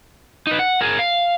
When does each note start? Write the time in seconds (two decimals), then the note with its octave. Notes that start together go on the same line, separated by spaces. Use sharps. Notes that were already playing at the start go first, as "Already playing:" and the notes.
0.47 D#4 B4
0.59 F#5
0.81 G#4 A#4
0.99 F5